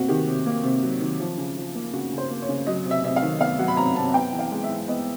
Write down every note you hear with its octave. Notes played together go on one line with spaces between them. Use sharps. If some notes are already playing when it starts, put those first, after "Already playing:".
Already playing: C3 A#3 F#4
D#3 G4
C3
A#3
C3
F#3
D#3
F3
C#3
F3
A#3
C#3 F#4
C#3
C5
A#3
C#5
C#3
F#3 D#5
C3
E5
C3 E5
F5
D#3
B3 F5
F#3 F#5
B5
C3 A#5
C3 A5
B3 G5
E3
F5
G#3
E5
E3
B3 D#5